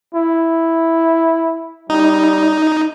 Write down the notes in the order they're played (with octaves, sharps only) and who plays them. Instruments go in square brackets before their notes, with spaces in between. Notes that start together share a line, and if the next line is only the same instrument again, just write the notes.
[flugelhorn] E4
[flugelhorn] G3 [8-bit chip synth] D#4